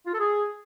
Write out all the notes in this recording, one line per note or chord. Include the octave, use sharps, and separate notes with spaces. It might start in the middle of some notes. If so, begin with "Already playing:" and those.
F4
A4
G#4